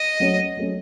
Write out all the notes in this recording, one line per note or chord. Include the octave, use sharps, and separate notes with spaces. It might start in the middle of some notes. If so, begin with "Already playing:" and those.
Already playing: D#5
F#3 A3 C#4
F#3 A3 C#4